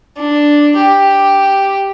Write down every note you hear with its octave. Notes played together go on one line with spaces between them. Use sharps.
D4
G4